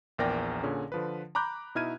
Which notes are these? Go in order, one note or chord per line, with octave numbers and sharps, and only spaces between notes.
A#1 E2 A#4 D5 G5 A#6
A#2 D3 C#4 G#4
D3 F3 B4
A#5 B5 D6 F#6 G6
B2 D#4 E4 F6 G#6 D#7